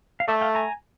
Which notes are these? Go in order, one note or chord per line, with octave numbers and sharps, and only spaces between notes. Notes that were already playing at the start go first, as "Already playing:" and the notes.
F5
A3 D5 E5
F5 G5
G#5 A#5